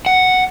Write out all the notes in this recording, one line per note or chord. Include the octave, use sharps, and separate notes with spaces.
F#5